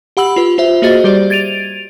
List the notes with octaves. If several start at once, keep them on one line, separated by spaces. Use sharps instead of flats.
G4 F#5 B5 E6 F#7
F4 B4
F4 C5 E5
A#3 F#4 G#4 C5 D#5 A6
G3 G4 C5 D5
G#6 A6 D7 D#7 F7